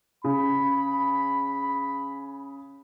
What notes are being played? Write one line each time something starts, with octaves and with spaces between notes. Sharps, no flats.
C#3 B5